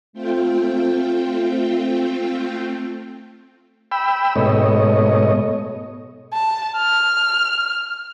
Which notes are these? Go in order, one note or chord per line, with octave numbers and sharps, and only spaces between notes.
A3 C4 F4 G5
G5 B5 E6
G#2 B2 A3 C#5 D#5
A5
F6